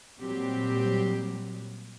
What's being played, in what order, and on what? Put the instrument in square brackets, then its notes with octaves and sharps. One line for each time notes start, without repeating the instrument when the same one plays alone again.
[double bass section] A#2 F#3 G3 [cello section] C4 G4